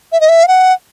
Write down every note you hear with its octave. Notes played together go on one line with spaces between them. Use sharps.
E5
D#5
E5
F5
F#5